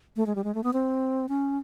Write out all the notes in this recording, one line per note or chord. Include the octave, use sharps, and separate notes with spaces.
A3
G#3
G3
G#3
A3
B3
C4
C#4